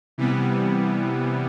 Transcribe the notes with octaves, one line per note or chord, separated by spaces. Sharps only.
C3 E3 G3 B3